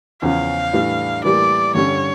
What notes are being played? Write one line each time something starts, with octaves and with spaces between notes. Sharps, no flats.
E2 C#3 F3 C#4 F5
A2 E3 G3 D4
A2 E3 G3 A#3 D5
G2 D3 G3 C#4 C#5